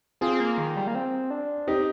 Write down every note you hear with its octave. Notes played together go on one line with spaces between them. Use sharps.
C4 F4 G#4
A#3
D#3
G3
A#3
C4
D4
C4 D#4 G4